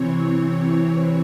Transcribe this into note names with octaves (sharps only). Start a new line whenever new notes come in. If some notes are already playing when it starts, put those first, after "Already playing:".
Already playing: C3 E3 C4 C#5